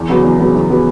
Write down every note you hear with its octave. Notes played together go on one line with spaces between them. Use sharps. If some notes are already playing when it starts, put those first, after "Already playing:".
Already playing: E2
C#3 F#3 B3
E2
C#3 F#3 B3
E2
C#3 F#3 B3